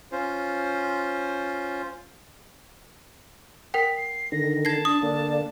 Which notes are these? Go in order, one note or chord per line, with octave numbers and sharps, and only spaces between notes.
C#4 F4 C5
A#4 F#5 G5 B6
C7
D3 D#3 A#6
A5 G#6 A#6 C7
D4 D#6
D3 A#3 D5